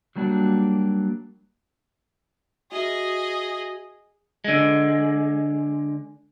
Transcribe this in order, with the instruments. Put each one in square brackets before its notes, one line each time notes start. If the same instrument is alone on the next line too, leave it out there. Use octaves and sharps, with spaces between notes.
[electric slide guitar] F#3 G3 A#3 D4 F#4
[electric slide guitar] F#4 E5 [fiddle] G#4 D#5
[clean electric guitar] D3 G#3